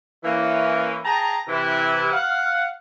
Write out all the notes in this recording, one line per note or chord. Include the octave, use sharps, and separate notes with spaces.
E3 A#3 C#4
G#4 G5 A5 A#5
C3 E3 E4
F5 F#5